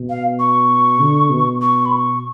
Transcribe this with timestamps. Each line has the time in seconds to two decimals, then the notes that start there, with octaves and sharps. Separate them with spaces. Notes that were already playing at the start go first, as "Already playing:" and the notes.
Already playing: B2
0.09 F5
0.39 C#6
1.00 D3
1.30 B2
1.61 C#6
1.85 B5
1.91 C#6